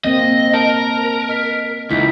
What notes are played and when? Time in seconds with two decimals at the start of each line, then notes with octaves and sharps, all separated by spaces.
0.04 A#3 C4 D#5
0.54 A#4 A5
1.29 D#5 F6 B6
1.91 C#2 D#4 E4 B6